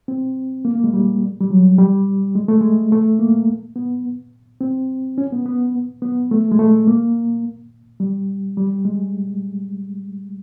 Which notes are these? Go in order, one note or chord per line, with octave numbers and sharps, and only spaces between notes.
C4
A#3
A#3
G#3
G3
G3
F#3
G3
G#3
A3
G#3
A3
A#3
B3
C4
C#4
B3
B3
B3
A3
G#3
A3
A#3
G3
G3
G#3